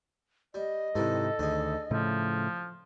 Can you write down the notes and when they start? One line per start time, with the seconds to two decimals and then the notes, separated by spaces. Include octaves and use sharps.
0.54 G3 D#5
0.95 G#2 C3 D#3 E3 G3 A4
1.39 D2 D#3 D4 G#4
1.91 A2 C#3 F3 A3